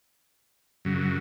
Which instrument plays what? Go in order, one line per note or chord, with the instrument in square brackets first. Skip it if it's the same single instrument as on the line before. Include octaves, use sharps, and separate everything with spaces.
[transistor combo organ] F#2 C#3 F#3